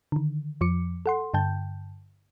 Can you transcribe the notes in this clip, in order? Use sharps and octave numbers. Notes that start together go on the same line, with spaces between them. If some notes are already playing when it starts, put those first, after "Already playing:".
D3 D#3
F2 F3 D6 C#7
A4 F#5 C6
G2 D3 G5 A5 G6